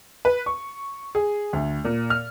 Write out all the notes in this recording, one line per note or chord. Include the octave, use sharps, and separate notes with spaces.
B4
C#6
G#4
D2
A#2
F6